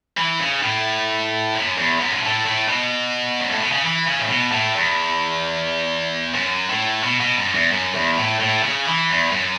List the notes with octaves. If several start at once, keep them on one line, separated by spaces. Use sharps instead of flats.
E3
C#3
A2
F#2
E2
F#2
B2
A2
A2
B2
F#2
A2
B2
C#3
E3
C#3
A2
B2
A2
E2
F#2
A2
B2
B2
F#2
E2
F#2
E2
A2
A2
C#3
E3
E2
F#2